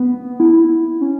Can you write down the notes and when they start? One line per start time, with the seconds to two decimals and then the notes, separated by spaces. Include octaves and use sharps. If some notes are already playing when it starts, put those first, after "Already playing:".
Already playing: B3
0.40 E4
1.01 C#4